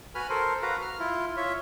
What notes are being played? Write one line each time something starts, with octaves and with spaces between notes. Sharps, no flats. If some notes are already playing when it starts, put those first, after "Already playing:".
F#4 B4 G#5 B5 F6
A4 A#4 C5
F#4 B4 F5 A#5
F6
E4 F4
F4 C#5 E5